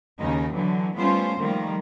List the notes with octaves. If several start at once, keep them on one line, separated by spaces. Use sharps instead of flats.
D#2 C#3 D#4
D3 E3 F#3
G3 A3 B3 C#4 F4 C5
D#3 F3 G3 A3 A#3